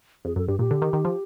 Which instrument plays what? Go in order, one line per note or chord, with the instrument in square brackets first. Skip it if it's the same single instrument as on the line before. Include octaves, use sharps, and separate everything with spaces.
[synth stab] F2 [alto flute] G#4
[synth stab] F#2 [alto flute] A4
[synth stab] G2 [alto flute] G4
[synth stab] A#2 [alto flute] G4
[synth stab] D3
D#3
D#3
F3